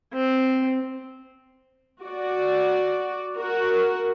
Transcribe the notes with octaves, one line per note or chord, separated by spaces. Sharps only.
C4
F#4 D5
F#4 A#4